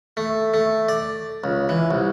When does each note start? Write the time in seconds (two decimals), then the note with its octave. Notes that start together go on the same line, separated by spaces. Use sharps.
0.17 A3
0.54 A3
0.89 D5
1.44 C#2
1.69 E3
1.91 C2